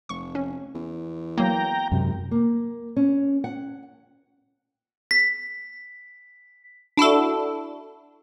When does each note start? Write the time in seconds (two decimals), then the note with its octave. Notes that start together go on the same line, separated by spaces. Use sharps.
0.09 F1 C#6
0.35 C#4
0.74 E2
1.38 F#3 A#3 G5 A#5
1.92 G#1 F#2 C3
2.31 A#3
2.96 C#4
3.44 F#5
5.11 B6
6.97 D4 E4 F#4 A4